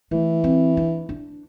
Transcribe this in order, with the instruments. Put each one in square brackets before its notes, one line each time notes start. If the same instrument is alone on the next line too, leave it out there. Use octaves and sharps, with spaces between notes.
[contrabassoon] E3 [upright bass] A3
[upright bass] C4
D4
D4